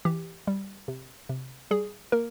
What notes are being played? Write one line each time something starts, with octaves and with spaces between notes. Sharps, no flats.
E3 G4
G3
C3
C3
G3 G#4
A#3 A#4